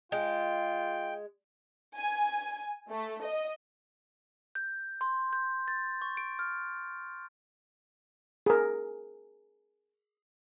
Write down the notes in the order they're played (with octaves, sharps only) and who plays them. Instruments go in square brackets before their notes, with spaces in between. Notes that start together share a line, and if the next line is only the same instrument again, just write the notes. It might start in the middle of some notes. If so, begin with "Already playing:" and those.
[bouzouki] G#3 [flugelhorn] F4 [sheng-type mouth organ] G5
[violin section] G#5
A3
D#5
[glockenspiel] G6
C6
G6
A6
C#6
D7
F6
[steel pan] G#4 A#4